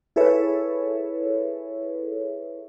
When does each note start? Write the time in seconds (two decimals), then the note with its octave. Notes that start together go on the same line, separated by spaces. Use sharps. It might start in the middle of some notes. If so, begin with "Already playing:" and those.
0.16 E4 G#4 A4 B4 C#5 E5